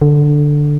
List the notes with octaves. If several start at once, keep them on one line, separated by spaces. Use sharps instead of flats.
D3